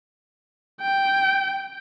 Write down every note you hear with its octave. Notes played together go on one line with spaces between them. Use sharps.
G5